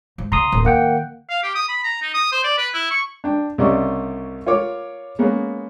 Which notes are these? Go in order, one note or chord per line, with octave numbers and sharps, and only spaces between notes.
G#2
C#3 A#5 C6 D#6
D1
D#3 A#3 F#5 G5
F5
G4
D#6
B5
A#5
D#4
D#6
C5
D5
B4
E4
C#6
D4 G5
C2 C#3 G4 D5 D#5 C#6
F4 A#4 C#5 D6
G#3 A#3 B3 C#4